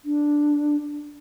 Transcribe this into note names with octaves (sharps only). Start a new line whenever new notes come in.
D4